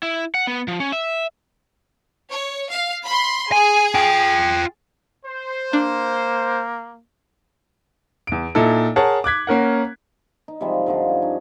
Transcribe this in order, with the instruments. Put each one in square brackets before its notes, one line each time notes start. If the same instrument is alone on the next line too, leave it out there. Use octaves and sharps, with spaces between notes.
[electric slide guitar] E4
F#5
B3
F3
C#4
E5
[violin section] C#5
F5
B5 C6
[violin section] G#4 [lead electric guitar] G#5
[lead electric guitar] F4 G5
[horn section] C5
[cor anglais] A#3 [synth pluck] D4
[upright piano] E2 D7
A#2 D#4 E4 A4
G#4 A#4 C#5 F#5 A5
D6 F#6 G#6 B6
A#3 C#4 A#4 F#5
[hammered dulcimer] D#4
C3 F3 G3 G#3
F3
G2 D3 F3 D#4
C#4
C#4 D#4